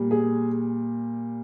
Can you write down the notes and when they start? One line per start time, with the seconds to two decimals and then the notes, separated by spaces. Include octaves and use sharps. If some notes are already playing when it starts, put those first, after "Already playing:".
Already playing: A#2 G3
0.11 G#4